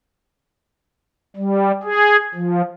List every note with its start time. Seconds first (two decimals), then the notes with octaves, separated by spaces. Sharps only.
1.36 G3
1.83 G#4
2.35 F3